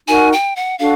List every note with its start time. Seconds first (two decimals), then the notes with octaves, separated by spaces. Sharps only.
0.08 D#4 F#4 A#4 G#5
0.33 G5
0.56 F#5
0.79 D4 F#4 A4 F5